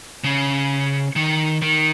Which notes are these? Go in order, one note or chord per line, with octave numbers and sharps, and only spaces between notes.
C#3
D#3
D#3